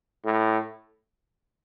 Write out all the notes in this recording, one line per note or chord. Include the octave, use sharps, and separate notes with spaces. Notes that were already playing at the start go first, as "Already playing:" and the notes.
A2